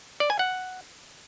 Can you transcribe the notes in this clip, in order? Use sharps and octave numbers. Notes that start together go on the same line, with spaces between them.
D5
G#5
F#5